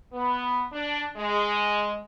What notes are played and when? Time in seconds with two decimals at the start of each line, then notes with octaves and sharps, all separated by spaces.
0.13 B3
0.72 D4
1.17 G#3